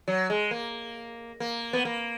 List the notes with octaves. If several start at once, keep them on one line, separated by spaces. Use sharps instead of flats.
F#3
G#3
A#3
A#3
B3
A#3